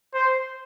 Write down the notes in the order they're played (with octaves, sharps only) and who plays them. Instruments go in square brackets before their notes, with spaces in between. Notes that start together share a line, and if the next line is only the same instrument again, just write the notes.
[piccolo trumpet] C5